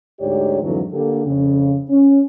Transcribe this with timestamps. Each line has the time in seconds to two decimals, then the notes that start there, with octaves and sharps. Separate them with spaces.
0.20 D2 G#2 G4 C#5 D5
0.63 F2 G#2 D3 E3 F#3
0.94 D3 A#3 G4 A4
1.26 F2 C#3
1.90 C#4